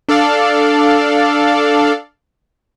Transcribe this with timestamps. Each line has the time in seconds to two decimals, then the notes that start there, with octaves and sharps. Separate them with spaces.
0.08 D4 A4 D5 F5